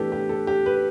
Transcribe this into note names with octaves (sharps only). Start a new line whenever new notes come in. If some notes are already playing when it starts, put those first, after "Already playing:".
Already playing: A2 E3 B3 D4 G4 A4 B4
G4
A4
G4
B4